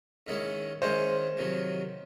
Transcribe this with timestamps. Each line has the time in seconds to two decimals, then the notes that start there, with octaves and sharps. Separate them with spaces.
0.27 G#2 D#3 G#3 C#4 E4
0.82 G#2 D#3 G#3 C#4 E4 C5
1.37 F2 C3 D#3 F#3